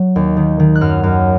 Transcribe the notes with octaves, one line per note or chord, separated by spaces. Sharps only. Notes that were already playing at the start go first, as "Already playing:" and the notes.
Already playing: F#3
D#2
D#3
D#3
F#6
F#2 F6
F#2